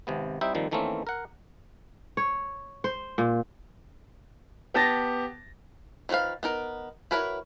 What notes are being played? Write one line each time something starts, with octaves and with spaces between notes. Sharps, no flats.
G#1 C3 B3
G3 C4 D#4 E4 E5 G5
A#2 D#3 F3 G3 C4
D#3 E3 A3 A#3 C4 C#4
A#4 F#5
C#5
C5
A#2
B3 G4 A5 A6 A#6
D#3 F3 F#4 B4 F5
B3 D#4 A#4
E4 F#4 A#4 B4 C#5